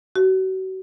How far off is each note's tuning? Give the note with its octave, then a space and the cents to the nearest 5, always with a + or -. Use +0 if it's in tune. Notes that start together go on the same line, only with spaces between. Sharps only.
F#4 +35